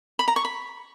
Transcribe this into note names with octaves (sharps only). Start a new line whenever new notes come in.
B5
A#5
C#6
B5